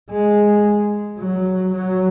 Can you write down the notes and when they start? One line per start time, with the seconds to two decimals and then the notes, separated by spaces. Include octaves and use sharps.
0.10 G#3
1.18 F#3
1.73 F#3